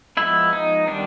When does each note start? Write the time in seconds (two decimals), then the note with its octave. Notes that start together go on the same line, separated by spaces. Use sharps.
0.17 F3 G#3 B3 E4
0.53 D#4
0.88 D#3 G3 B3 D4